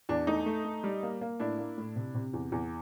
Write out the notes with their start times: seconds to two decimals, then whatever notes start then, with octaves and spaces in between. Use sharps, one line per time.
0.09 E2 D4
0.27 A3 D#4
0.46 A3
0.65 A3
0.84 G3
1.03 A#3
1.21 A#3
1.40 A2 D4 E4
1.59 A#3
1.78 A2
1.96 C3
2.15 C3
2.34 E2
2.52 E2